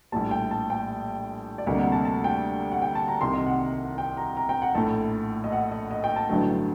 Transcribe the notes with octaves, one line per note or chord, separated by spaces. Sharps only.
A#1 A2 G3 A5
G5
A5
G5
D5
D2 C3 G3 A#3 D#5
F#5
A5
A5
G5
F#5
G5
A5
A#5
C2 C3 D#3 C6
D#5
F#5
G5
A#5
A#5
G5
F#5
A#1 A2 A3 A5
D#5
F#5
D#5
D#5
G5
A5
A1 G2 D3 F#3 A3